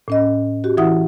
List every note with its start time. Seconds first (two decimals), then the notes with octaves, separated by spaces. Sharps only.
0.08 A2 C#4 D#5
0.64 F#4 G4
0.77 E3 E4 E5 F#5 D#6